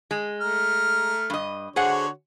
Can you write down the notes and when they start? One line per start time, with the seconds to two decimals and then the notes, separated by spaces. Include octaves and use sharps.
0.11 G#3
0.41 A3 A#5 F6
1.30 G2 D#5
1.76 D3 F#4 G#4 C5 C#5 F#5